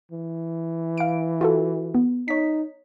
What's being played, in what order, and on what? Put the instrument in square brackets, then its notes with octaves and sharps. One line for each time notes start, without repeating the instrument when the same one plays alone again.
[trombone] E3
[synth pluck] F5 D7
F4 F#4 A4
B3
[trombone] D#4 [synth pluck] C#5 B6